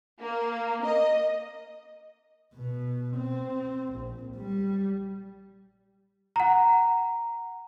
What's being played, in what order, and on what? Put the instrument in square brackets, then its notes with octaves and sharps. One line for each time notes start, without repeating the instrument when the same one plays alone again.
[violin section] A#3
D#5
[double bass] B2
C4
A#1
G3
[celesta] F#5 A#5